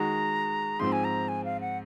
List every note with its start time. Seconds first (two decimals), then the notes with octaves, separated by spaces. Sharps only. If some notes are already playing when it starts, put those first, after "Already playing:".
Already playing: D#3 G#3 D#4 F#4 A#5
0.80 G#2 F3 C4 C6
0.92 G#5
1.04 A#5
1.28 G#5
1.45 F5
1.61 F#5